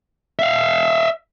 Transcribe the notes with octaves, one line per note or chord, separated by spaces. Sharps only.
E5 F5